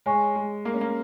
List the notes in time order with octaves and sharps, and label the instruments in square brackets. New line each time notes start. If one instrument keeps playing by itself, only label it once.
[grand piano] G#3 [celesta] C#5 G#5 C#6
[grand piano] G#3
A#3
C#4
A#3